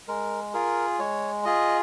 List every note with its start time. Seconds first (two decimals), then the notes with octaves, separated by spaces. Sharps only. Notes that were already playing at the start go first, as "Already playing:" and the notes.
0.08 G#3 A#4
0.54 F4 G#4 A#4
0.99 G#3 C#5
1.45 F4 G#4 D#5